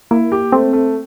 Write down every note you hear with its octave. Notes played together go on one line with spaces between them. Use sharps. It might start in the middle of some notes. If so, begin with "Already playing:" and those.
A#3 E4
G4
A3 C4
A3